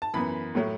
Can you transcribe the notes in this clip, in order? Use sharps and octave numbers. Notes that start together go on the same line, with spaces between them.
A5
F#2 E3 B3 B5
A2 F#3 A3